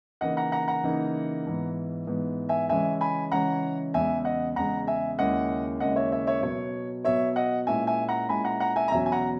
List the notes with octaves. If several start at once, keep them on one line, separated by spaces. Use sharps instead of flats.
C#3 E3 A#3 D#4 D#5 F#5
F#5 A#5
F#5 A#5
F#5 A#5
C#3 E3 A#3 D#4
G#2 E3 B3
G#2 E3 B3
E5 G#5
C#3 E3 G#3 C#4 E5 G#5
G#5 B5
C#3 E3 G#3 C#4 F#5 A#5
E2 C#3 G#3 E5 G#5
D#5 F#5
E2 C#3 G#3 F#5 A#5
E5 G#5
D#2 C#3 G#3 C#4 E4 D#5 F#5
D#2 C#3 G#3 C#4 E4 D#5 F#5
C#5 E5
C#5 E5
C#5 E5
B2 F#3 B3 C#5
B2 F#3 B3 C#5 E5
D#5 F#5
A#2 G#3 C#4 E4 E5 G#5
E5 G#5
F#5 A#5
A#2 G#3 C#4 E4 G#5 B5
F#5 A#5
F#5 A#5
E5 G#5
A#5
E2 B2 F#3 C#4 E5 G#5
G#5
F#5 A#5